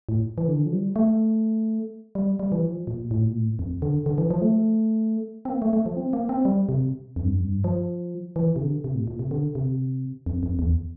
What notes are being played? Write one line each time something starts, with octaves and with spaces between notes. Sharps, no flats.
A2
E3
D3
F3
G3
A3
G3
G3
E3
F3
A#2
A2
A#2
A2
F2
D3
D3
E3
F3
A3
C4
A#3
A3
A3
F3
C4
A#3
C4
G3
C3
F2
G2
F2
G2
F3
E3
C3
D3
C3
A2
A#2
C3
D3
C3
F2
F2
E2